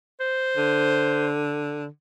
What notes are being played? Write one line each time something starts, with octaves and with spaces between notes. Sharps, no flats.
C5
D3